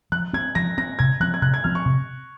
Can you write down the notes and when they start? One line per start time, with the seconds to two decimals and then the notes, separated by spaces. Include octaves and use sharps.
0.12 F3 F#6
0.33 C4 G#6
0.55 F3 A#6
0.78 C4 A#6
0.99 C3 G#6
1.20 F3 C4 F#6
1.34 G#6
1.42 C3 F#6
1.54 G#6
1.64 F3 C4 F6
1.75 C#6
1.86 C3